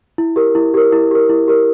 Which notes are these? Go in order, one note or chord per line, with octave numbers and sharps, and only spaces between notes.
E4
G4 A#4
E4
G4 A#4
E4
G4 A#4
E4
G4 A#4